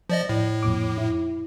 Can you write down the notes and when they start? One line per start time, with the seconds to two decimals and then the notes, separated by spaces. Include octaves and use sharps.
0.10 F3 D5 D#5
0.29 A2
0.63 F2 A#2 D6
0.98 E4